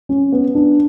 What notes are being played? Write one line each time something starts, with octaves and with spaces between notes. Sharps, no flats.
C#4
B3
D4